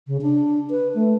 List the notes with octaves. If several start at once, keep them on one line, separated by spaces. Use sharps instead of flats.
C#3
D4
B4
A3